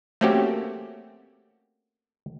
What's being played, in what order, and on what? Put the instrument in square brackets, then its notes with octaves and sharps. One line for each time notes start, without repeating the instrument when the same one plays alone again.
[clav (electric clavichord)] A3 A#3 C4 C#4 F#4 G4